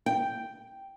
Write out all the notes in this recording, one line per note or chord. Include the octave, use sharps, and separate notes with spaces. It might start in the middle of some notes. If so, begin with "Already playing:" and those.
G5